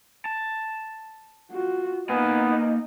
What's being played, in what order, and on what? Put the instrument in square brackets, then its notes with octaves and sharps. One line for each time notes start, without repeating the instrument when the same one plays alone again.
[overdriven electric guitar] A5
[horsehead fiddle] F4 F#4
[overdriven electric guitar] A#3 G#5 [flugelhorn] B3 [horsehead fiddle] D#4 D#5